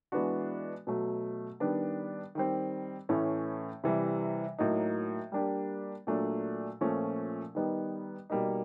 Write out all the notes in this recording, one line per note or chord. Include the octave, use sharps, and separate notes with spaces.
E3 G#3 B3 D4 F#4
B2 F#3 A3
D#3 G3 B3 D4
D#3 G3 C4
A2 E3 A3 C#4
C3 E3 G3
A2 F#3 A#3 D#4
G3 A#3 D4 G4
A#2 F#3 A3 D4
A#2 F3 A3 C#4
D#3 G3 B3 D#4
B2 G3 A#3 D#4